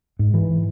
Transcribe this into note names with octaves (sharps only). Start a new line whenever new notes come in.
G#2
E3